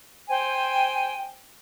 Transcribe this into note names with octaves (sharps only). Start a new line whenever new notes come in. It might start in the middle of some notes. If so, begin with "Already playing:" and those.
C5 G5 G#5